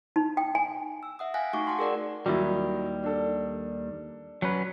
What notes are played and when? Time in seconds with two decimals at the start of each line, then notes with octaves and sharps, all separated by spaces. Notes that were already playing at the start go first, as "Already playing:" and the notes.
0.16 D#4
0.37 G5
0.55 G#5
1.03 E6
1.19 E5 F#5 D#6
1.34 F5 G5 G#5 F#6 A#6
1.53 A3 D#4 F#4 C#6 D6 A#6
1.67 F#5 G5 A5 C6
1.79 G#4 A#4 D5 F#5
2.26 D#2 D#3 F#3 G3 E4
3.03 D4 A4
4.42 F#3 C#4 B4